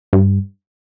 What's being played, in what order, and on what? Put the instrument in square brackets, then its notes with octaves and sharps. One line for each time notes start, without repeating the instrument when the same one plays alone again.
[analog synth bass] G2